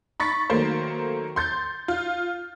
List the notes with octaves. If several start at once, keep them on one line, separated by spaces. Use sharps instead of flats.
B5 C#6 A6 B6
D#3 F#3 A3 A#3 C5
C6 G6 A6
F4